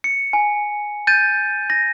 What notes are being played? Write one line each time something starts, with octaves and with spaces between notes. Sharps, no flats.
C#7
G#5
G6 A6 D#7
A#6